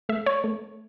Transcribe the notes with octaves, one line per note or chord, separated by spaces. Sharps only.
A3 E5
C#5
A3